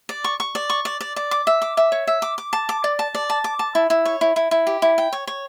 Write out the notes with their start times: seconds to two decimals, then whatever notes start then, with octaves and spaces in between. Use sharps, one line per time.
0.09 D5
0.24 C#6
0.40 C#6
0.55 D5
0.70 C#6
0.85 D5
1.01 D5
1.16 D5
1.31 D6
1.47 E5
1.62 D6
1.77 E5
1.92 C#5
2.07 E5
2.22 D6
2.38 D6
2.53 A5
2.69 D6
2.84 D5
2.99 A5
3.15 D5
3.30 A5
3.44 D6
3.59 A5
3.75 E4
3.90 E4
4.05 C#5
4.21 E4
4.36 E4
4.51 E4
4.67 G4
4.82 E4
4.98 G5
5.13 C#5
5.27 C#5